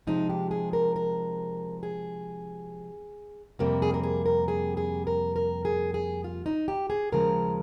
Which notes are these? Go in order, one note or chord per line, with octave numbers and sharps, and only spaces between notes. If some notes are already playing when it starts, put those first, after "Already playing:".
C3 F3 G#3 D#4
G4
G#4
A#4
A#4
G#4
F2 C3 G3 A#3 A#4
G#4
A#4
G#4
A#4
G#4
G#4
A#4
A#4
G#4
G#4
F4
D#4
G4
G#4
D#2 C#3 F3 G#3 A#4